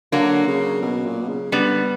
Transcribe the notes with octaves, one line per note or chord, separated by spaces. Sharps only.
D3 F#3 A#3
C#3
B2
A#2
B2
C#3
D3 G3 B3